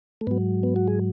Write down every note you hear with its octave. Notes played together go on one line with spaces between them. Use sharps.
A3
G#2 F#3 B3
B3
F#4
G#4